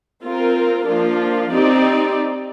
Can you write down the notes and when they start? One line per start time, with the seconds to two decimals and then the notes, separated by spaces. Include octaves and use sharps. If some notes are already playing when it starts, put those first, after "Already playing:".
0.22 C4 F4 A#4
0.87 F3 A#3 D4 F4
1.51 C4 D#4 G4 D5